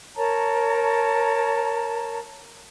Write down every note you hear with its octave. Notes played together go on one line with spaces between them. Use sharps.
A#4 C#5 A5 A#5